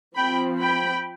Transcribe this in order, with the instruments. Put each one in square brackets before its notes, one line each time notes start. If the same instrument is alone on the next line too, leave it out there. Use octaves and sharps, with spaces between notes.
[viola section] F3 C4 G5 B5
G5 B5